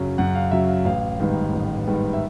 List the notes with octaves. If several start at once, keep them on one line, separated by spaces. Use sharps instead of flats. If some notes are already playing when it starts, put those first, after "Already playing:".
Already playing: F#2 C#3 F#3
F#2 F#5
F5
C#3 F#3 E5
F5
A1 F5
G#2 D#3 G3 B3
A1
G#2 D#3 G3 B3
E5